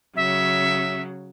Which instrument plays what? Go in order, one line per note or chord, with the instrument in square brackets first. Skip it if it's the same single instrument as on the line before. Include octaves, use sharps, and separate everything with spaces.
[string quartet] C#3 F#3 [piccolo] E5